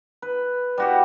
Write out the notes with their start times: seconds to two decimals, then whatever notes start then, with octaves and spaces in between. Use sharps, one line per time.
0.22 B4
0.78 G3 F#4 G4